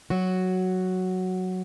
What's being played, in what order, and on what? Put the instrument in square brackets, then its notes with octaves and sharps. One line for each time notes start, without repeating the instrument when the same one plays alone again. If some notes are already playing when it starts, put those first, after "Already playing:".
[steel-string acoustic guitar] F#3 F#4